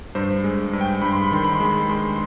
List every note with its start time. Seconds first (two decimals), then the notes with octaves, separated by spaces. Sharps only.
0.15 G2 C5
0.44 G#3
0.73 G2
0.81 G5
1.02 G2 B5
1.13 C6
1.24 B5
1.32 D#3 C6
1.44 B5
1.54 C6
1.60 G#3
1.65 B5
1.89 G#3 C6